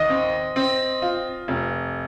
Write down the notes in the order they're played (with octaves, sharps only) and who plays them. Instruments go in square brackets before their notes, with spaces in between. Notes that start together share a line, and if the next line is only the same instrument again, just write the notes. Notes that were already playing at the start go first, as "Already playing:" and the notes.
Already playing: [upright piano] D#2 [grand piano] D#5
[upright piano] C4
C4
F4
F1